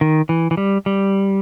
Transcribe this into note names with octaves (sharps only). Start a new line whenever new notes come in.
D#3
E3
E3
G3
G3